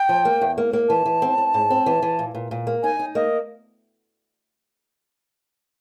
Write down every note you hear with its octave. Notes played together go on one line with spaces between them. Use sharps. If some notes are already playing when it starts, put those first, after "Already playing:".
Already playing: G5
F3
A#3
E2
A#3
A#3
E3 A5
E3
C4
C4
G#2
C4
E3
E3
A#2
A#2
A#2
A#3
D#4 G#5
D#4
A#3 D#5